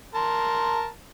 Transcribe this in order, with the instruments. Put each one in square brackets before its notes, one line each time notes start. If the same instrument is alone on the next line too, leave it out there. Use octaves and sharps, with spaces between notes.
[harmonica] A#4 A5 C6